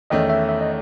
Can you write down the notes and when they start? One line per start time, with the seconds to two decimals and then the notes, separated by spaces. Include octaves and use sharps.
0.10 E2 D#3 A3 C#4 D#5
0.29 E5
0.49 E5
0.61 D#5